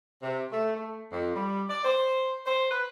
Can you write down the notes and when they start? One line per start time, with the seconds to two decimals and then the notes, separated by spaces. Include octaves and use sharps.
0.22 C3
0.51 A3
0.76 A3
1.12 F2
1.34 G3
1.69 D5
1.84 C5
2.45 C5
2.70 B4